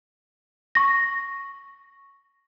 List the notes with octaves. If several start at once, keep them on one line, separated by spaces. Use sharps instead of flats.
C#6 A#6